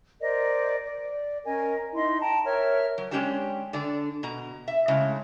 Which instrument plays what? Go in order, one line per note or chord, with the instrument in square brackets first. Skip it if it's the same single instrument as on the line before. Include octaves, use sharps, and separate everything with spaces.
[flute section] A#4 C5 D5 D#5
D5
C#4 A#4 D#5 G#5
D#4 E4 D#5 C6
G5 A5 A#5
A#4 C#5 E5 F6
[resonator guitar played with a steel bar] F#3
G#3 C#4 D4 G4 C#5 A5
D3 D4 D5
B2 A#5
E5
A2 C#3 G#3